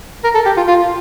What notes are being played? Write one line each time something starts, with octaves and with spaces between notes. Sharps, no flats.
A#4
A4
G4
F4
F4